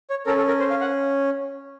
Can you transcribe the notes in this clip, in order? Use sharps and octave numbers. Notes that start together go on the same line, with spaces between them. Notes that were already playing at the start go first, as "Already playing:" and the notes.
C#5
C#4 A4 A#4
A4
A#4
C5
F5
F#5